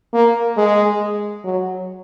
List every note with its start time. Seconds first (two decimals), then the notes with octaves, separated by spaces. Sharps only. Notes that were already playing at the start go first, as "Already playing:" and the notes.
0.13 A#3
0.57 G#3
1.44 F#3